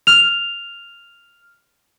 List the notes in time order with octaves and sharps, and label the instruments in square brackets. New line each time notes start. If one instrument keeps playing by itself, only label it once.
[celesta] F6 F7